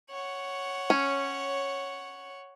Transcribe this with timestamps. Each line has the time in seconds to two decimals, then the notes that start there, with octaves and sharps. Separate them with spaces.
0.11 C#5 F#5
0.90 C#4